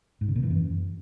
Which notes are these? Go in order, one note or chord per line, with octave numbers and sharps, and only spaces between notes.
G#2
C#3
A#2
E3
F#2